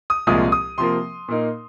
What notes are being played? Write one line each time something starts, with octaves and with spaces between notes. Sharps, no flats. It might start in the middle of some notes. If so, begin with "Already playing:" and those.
D#6
C2 A#2 F3 G#3 F4 D#6
D#6
C3 F3 A#3 C6
A#2 A#3 D#4